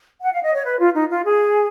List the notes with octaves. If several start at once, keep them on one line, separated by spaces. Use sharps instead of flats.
F#5
F5
D#5
C#5
B4
F4
D#4
F4
G#4